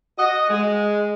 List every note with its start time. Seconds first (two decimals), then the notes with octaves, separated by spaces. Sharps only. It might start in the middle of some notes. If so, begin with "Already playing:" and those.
0.18 F#4 D#5
0.50 G#3